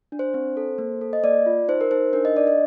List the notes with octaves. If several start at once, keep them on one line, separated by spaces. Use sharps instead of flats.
D4
C5
C4
A4
A#3
A4
D#5
A#3 D5
F4
D#4 C5
A#4
D#4 C5
D4 A#4
D#5
D4 D5
D#5